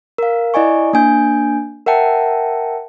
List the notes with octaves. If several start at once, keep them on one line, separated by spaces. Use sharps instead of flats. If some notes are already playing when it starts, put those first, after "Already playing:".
A#4 F5
E4 D5 D#5 G#5 C#6
A#3 D4 G#5 G6
A#4 E5 F#5 G5 A5